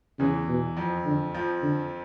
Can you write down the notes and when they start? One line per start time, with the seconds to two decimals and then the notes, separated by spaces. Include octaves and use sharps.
0.19 E2 C#3 E3
0.48 B2
0.77 F2 F3
1.05 D3
1.34 F2 F3
1.63 D3